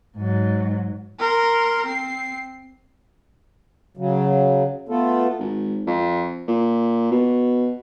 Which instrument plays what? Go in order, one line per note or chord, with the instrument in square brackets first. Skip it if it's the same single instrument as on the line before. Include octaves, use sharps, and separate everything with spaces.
[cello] G#2 F#3
[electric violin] A#4 C6
C4 C7
[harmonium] C#3 F#3
A3 B3 F4 A4
[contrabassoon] G#1
F2
A#2
B2